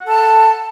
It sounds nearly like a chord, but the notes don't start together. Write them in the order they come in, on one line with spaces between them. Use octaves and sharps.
F#5 A4 A5